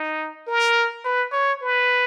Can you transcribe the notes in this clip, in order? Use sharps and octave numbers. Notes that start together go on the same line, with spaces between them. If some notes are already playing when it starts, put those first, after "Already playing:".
Already playing: D#4
A#4
B4
C#5
B4